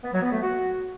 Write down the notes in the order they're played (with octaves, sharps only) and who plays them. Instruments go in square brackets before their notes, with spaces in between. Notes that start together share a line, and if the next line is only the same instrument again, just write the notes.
[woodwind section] B3
F#3
B3
A3
F#4